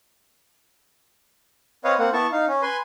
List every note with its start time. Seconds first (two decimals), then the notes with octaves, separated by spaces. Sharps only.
1.84 C4 B4 C#5 D#5 F5
1.99 A#3 C4 F#5
2.13 B3 E4 A5 C#6
2.32 D#4 F5
2.48 C#4
2.62 B4 G#5 C6